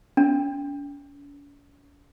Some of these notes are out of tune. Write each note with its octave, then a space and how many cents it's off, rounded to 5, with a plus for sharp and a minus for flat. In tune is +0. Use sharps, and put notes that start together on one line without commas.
C#4 +45